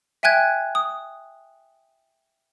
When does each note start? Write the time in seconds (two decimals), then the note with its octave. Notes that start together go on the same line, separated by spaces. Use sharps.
0.23 E5 G5 G#5 F#6 G#6
0.75 D#6